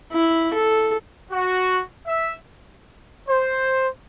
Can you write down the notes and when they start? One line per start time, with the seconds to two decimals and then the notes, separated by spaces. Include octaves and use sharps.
0.12 E4
0.53 A4
1.31 F#4
2.07 E5
3.28 C5